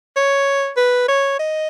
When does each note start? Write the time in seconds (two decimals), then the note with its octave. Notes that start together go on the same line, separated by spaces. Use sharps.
0.16 C#5
0.77 B4
1.08 C#5
1.39 D#5